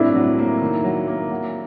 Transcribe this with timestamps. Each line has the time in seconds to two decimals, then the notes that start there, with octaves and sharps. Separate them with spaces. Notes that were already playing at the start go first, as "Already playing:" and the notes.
Already playing: A2 C4 D4 E4
0.15 F#3
0.39 A#3
0.62 D#3
0.84 F#3
1.07 A#3
1.31 F#3